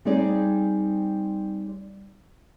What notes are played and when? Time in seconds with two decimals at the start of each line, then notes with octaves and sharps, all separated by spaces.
0.05 G3 C4 D#4 G#4 D5